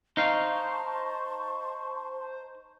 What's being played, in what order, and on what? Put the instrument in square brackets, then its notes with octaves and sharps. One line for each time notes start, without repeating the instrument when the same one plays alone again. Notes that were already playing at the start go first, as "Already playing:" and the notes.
[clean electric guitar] D#4 F5 [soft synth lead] C5 [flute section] A5 C6 C#6